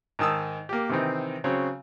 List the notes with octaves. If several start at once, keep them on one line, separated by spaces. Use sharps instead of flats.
G#2 D#3 A5 D#6 E6
A#3 G4
C3 D#3 E3 C4 D#4
C#3 F#3 C4 C#5